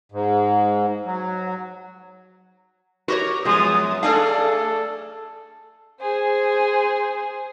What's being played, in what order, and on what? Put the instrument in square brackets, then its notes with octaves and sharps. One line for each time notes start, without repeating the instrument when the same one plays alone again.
[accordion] G#2
F#3
[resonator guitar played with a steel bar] F#4 G4 C#5 [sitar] A#4 B4
[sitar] F#2 B3 [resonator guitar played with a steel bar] F3 G#3 [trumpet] D#6
[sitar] A3 D4 G#4 [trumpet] A4 [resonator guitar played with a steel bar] D5 F5
[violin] G#4 C5